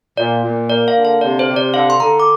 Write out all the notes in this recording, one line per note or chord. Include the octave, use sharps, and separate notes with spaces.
A#2 D5
A#2
A#3 D5
F5
D3
F5
C3 D5
C5
C3
D5
D3 F5
C6
D3 A#5
D6